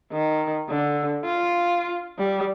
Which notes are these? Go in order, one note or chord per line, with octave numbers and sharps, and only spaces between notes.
D#3
D3
F4
G3